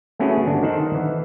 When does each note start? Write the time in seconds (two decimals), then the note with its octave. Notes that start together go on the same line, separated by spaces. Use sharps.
0.19 A3 B3 C#4 E4 F#4 G#4
0.46 G1 D4
0.63 D#3 D#4 A4 C5 F#5
0.95 E3